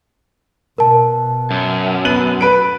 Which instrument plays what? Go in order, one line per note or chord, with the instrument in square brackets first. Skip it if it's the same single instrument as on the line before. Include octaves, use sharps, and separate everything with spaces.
[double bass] B2 [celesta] A#4 A5
[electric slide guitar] F#2
[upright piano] B3 D#7 F#7
B4 D7